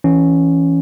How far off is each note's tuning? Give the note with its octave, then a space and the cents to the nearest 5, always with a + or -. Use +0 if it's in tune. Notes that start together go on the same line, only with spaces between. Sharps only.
E3 +0 C#4 +0